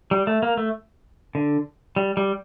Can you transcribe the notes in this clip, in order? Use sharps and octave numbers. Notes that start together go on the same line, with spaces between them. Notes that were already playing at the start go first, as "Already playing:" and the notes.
G3
A3
A#3
A3
D3
G3
G3